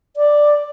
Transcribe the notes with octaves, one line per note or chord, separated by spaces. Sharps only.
D5